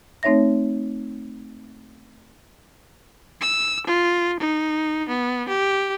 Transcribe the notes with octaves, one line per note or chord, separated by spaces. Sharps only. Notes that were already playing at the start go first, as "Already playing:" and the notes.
A3 C4 D#4 C#5 E5 A#6
E6
F4
D#4
B3
G4